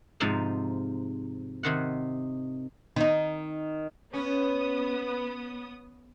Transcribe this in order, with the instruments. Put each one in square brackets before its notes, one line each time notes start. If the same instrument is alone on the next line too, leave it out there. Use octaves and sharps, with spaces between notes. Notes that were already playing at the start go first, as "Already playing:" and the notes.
[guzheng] G#2 C3 F3 D#4
C3 D#3 F#5
[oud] D#3 D#4
[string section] B3 D#6 [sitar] C#4 [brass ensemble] B4